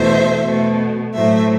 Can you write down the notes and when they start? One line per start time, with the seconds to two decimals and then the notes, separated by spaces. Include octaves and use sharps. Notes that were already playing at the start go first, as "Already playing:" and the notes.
Already playing: E2 B2 A3 C5 E5
0.44 B2 A3
1.14 A2 F#3 A3 C5 E5